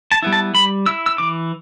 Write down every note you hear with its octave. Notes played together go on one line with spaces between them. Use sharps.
A5
G3 B3 E4
A5
G3 B5
E4 E6
E6
E3 D6